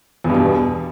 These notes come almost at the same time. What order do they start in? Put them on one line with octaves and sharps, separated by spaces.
E2 G2 B2